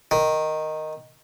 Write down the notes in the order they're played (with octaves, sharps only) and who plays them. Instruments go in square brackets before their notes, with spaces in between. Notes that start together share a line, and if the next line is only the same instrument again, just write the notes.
[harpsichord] D#3